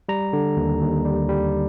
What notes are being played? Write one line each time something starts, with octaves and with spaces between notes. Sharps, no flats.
G3 A#5
D3
D#2
D#2
G3
G3